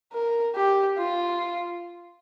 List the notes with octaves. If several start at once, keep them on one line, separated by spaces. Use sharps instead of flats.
A#4
G4
F4